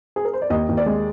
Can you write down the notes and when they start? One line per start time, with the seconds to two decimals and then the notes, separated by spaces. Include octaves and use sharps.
0.16 G#4
0.25 A#4
0.33 C5
0.42 D5
0.50 D#2 D#5
0.69 D#2
0.77 D5
0.86 G#3